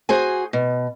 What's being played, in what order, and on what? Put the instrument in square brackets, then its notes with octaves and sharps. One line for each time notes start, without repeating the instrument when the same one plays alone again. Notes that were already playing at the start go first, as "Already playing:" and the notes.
[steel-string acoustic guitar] F#4 G#4 C5 G#5
B2